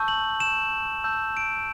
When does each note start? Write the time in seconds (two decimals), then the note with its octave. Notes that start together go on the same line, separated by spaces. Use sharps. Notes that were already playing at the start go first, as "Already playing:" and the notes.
Already playing: A5 C#6 E6 G6
0.08 F#7
0.40 E7
1.04 A5 E6 G6
1.37 D7